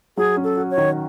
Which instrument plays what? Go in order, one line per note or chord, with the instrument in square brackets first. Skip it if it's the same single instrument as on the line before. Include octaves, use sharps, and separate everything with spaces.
[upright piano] F#3 [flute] G#4
[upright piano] C#4
[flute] A4
[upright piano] F#4
[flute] C#5
[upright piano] D#3